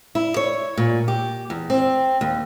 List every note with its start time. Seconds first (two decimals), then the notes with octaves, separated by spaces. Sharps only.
0.15 E4
0.36 C#5
0.77 A#2
1.08 G4
1.50 E2
1.70 C4
2.21 D#2